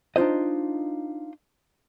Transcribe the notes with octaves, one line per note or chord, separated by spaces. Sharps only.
D4 D#4 F4 C5 D#5